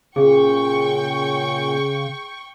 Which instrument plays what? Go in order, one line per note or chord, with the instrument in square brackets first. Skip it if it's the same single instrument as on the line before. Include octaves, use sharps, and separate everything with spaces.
[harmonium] A#2 [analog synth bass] C#3 [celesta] G#4 [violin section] G5 C#6